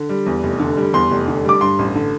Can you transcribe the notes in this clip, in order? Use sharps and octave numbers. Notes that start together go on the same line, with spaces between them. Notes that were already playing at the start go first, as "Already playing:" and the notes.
Already playing: D3
G3
E2
F1
D3
G3
E2 C6
F1
D3
G3 D6
G2 C6
A1
D3